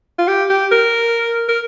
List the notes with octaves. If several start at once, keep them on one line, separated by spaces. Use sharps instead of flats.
F4
G4
G4
A#4
A#4